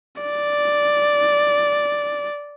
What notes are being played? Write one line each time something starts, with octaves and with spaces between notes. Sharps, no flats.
D5